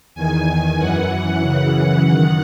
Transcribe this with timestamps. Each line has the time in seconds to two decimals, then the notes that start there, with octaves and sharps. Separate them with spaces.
0.15 E2 D#3 G#5
0.47 G#5
0.78 F#2 E3 F#5
1.41 F#2 C#3 E3 F#5
2.04 F#2 D#3